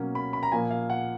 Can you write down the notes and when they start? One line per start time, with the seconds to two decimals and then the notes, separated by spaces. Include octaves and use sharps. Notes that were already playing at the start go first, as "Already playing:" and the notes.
Already playing: B2 F#3 A#3 C#4
0.15 B5
0.33 B5
0.43 A#5
0.52 A#2 F3 A#3 G#5
0.71 F5
0.90 F#5